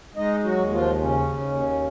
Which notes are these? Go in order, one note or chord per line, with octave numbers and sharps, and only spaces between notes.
G#3 D#4 D#5
F#3 F#4
D#2
F3 F4
C#3 C#4
D#2